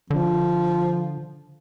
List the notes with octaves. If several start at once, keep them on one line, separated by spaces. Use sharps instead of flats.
D3 F3